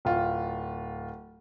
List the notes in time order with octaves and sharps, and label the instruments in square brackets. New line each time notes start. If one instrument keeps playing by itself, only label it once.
[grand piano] D1 F4